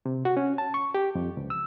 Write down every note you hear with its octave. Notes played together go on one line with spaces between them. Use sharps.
C3
F#4
C#4
A5
C#6
G4
F2
C#2
E6